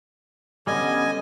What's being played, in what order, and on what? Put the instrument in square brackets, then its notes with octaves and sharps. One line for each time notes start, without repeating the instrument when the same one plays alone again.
[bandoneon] D3 D#5 G#5 [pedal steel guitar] G3 B3 C#4